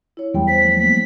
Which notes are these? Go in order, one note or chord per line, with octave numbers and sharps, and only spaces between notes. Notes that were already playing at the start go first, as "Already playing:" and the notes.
E4 C#5
E2 G3 B3 G5
C5 B6
F3 F#3 A3
A#3 B3 B6